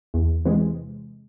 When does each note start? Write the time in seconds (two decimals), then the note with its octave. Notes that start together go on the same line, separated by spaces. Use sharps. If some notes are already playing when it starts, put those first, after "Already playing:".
0.14 E2
0.45 C3 E3 G#3